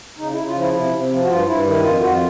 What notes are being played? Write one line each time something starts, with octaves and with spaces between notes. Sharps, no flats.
C#3 D#4
C#3 E4
F4
F3
E4
C3 E4
C3
F3
F#4
G2 F4
G2 E4
D#3 E4
F2 F4
F2 F#4
F4